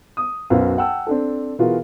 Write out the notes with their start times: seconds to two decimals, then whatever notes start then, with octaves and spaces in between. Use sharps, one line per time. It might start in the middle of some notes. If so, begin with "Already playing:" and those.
0.17 D#6
0.50 B1 F#2 F#4 B4 C5 F5
0.78 F#5 G5 A5 E6
1.07 C4 D4 A4
1.59 B2 E3 F4 F#4 G#4 A#4